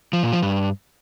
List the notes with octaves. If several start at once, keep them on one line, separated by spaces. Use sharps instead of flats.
F3
A#2
F3
G2